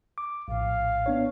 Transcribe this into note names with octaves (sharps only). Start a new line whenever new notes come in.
D6
A#1 A2 F5
B3 D4 C#5